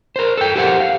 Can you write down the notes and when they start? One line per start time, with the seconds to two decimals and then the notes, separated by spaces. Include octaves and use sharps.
0.16 A#4 C5
0.37 A4 G5
0.56 G4 A#4 C5 F5 F#5
0.80 F5